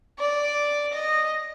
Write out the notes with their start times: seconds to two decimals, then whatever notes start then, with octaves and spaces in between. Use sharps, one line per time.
0.19 D5
0.93 D#5